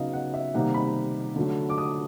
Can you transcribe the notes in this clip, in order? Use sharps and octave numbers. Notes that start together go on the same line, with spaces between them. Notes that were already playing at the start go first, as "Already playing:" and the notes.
Already playing: C#3 F#3 B3 D#4 D#5 F5
F#5
E5
C3 D#3 G3 A#3 D#4 F#5
B5
D3 F#3 A3
D6
D#6